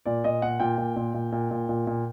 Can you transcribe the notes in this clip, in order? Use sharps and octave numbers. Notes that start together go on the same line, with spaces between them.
A#2 D5
A#2 D#5
A#2 F#5
A#2 G5
A#2
A#2
A#2
A#2
A#2
A#2
A#2